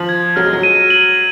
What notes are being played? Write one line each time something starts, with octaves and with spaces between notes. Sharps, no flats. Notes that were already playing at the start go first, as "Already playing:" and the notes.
Already playing: F3 F#7
G#6
F#3 F6
G#3
F#3
D#7
F#7